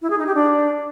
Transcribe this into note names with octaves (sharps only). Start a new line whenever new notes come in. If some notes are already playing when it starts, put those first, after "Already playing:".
E4
G#4
D#4
G4
D4